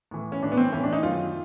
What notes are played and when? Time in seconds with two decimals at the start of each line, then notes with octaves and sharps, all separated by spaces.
0.11 A2 E3
0.32 C#4
0.43 A2 E3 D4
0.52 B3
0.57 C4
0.72 A2 E3 C#4
0.83 D4
0.93 D#4
1.03 F#2 D#3 F4